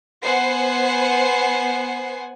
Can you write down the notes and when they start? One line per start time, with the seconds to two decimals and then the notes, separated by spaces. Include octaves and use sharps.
0.23 B3 C5 F#5 G#5 C7